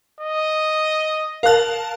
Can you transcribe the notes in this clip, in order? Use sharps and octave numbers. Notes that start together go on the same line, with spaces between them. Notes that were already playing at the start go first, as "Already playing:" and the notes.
D#5
A#4 F5 A5 F#6